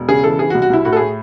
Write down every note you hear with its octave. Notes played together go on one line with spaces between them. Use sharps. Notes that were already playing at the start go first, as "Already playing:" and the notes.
Already playing: E1
C#3 G#4
E3 A4
E3 G#4
F#4
C2
F#4
C2 E4
A2 F#4
A4
A2 G#4